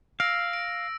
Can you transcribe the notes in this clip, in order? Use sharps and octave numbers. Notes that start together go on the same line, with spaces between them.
F5 E6 A#6 D7
D7